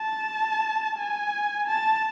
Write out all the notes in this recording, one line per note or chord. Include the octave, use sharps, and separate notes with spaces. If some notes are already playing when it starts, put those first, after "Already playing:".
Already playing: A5
G#5
A5